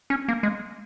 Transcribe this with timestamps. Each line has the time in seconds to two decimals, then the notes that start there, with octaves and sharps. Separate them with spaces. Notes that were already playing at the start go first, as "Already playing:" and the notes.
0.10 C#4
0.28 A#3
0.43 G#3